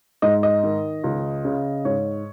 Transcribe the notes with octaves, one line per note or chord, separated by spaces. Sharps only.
G#2 D#5
D#5
D#3
C#2
C#3
G#2 C#5